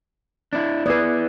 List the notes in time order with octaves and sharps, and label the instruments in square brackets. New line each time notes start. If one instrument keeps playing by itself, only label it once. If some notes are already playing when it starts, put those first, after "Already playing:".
[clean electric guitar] D4 E4
[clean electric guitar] B3 E4 G#4 [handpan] B4 D5